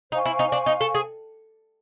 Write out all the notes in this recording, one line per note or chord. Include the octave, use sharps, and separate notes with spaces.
D#4 C5 F5 G#5 C#6
E4
D#4
D4
D#4
A4
G#4